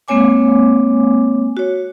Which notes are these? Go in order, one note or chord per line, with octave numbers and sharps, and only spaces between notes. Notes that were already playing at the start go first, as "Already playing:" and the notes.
G#3 A#3 C4 C#5 G#5 D6
F#4 C#5